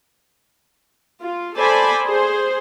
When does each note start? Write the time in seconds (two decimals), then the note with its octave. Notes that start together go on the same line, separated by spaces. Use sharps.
1.20 F4
1.56 A4 C5 D5 G#5 A5 B5
2.04 G#4 C5